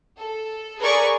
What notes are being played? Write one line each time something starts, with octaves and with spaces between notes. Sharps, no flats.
A4
G#4 A#4 B4 D5 C#6